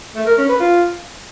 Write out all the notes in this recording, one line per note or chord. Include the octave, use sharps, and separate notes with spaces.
A3
A#4
C#4
B4
F4